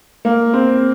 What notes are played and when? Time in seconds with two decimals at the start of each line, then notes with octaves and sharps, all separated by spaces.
0.25 A#3
0.53 C4